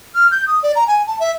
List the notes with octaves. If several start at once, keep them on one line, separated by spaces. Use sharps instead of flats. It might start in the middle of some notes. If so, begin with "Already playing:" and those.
F6
G6
D#6
D5
A#5
G#5
A5
E5